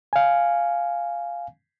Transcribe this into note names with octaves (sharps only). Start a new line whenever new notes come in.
F5 G#5